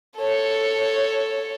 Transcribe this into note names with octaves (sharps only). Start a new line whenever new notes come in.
A4 C#5